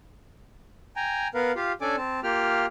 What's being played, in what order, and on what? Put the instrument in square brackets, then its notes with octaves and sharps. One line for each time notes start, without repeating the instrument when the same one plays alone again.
[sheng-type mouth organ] G5 G#5 A#5
B3 A#4 B4 F5
F4 G4 F5
C#4 D4 A4 D5 G#5 D6
C4 A5
A#3 F4 G4 G5 F6